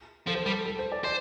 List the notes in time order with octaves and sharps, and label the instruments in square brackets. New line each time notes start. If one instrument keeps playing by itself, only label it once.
[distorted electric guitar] F3 [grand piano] A4
[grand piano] C5
[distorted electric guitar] G3 [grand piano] A4
[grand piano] A4
C5
D5
[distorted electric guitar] C5 [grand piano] D5